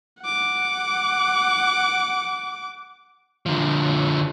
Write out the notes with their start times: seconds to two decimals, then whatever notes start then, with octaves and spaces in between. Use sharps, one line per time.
0.22 F#5 D6
3.46 D3 F3